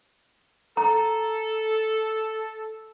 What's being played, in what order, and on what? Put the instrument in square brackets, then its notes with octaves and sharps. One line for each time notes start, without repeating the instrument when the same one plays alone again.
[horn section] A4 [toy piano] A#5